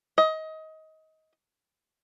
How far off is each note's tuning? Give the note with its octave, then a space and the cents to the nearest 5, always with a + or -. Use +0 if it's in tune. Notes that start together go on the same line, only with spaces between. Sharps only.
D#5 +25